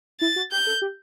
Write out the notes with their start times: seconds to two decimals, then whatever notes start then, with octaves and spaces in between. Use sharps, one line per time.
0.21 E4 A6
0.36 F#4
0.52 G4 G6
0.67 A4
0.82 G4